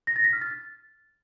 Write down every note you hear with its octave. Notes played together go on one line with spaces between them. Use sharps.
A#6
A6
B6
F6
A6